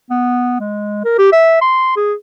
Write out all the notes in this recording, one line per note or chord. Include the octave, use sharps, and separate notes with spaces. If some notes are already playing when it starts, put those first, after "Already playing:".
B3
G#3
A#4
G4
E5
C6
G#4